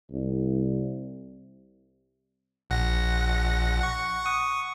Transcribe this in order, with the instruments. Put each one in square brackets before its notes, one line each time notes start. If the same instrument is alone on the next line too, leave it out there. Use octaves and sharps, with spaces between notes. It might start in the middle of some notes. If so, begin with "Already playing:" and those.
[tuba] C2
[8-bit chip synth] A#1 F#5 A#6
F#5 C#6
C#6 D#6